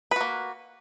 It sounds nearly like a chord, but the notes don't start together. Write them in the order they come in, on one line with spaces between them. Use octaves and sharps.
B4 F#4 A#3